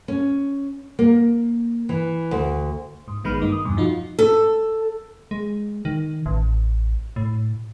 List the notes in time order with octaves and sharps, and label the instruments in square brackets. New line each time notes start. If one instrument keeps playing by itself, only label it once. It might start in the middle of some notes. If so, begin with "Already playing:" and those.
[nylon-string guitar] C#4
A#3
E3
D2
[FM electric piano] G#2
A#1 D#3 G#3 B3 B5 F6
G2 A#3 D#4
D#6
E2 G2 B2
F3 D#4 F4 F#4
[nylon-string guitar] A4
[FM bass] G#3
D#3
A1
A2